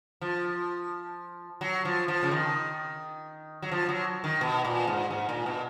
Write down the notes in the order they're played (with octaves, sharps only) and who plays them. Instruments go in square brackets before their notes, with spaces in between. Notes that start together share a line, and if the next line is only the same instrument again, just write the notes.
[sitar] F3
F#3
F3
F3
C#3
D#3
F#3
F3
F#3
D#3
B2
A#2
G#2
G#2
A#2
B2